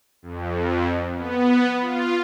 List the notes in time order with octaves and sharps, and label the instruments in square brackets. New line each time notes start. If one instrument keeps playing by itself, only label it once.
[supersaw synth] F2
B3
F4